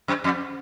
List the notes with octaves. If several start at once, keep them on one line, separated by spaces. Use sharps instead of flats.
F#2
F2